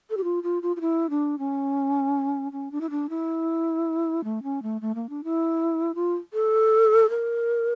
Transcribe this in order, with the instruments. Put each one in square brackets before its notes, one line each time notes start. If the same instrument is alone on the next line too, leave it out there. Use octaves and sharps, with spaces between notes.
[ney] A4
G4
F4
F4
F4
F4
E4
D4
C#4
C#4
D4
E4
D4
E4
A3
C#4
A3
A3
A#3
D4
E4
F4
A4
A#4